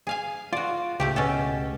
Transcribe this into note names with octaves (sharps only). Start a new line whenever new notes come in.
G#4 F5 G#5
F4 F#4 D5
C#2 A2 A3 G4
B2 C#4 A4